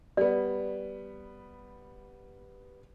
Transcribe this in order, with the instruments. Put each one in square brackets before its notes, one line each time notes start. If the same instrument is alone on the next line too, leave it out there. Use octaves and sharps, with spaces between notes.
[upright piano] G3 B3 [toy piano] D5